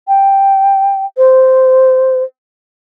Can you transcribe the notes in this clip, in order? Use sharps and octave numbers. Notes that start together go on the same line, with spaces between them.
G5
C5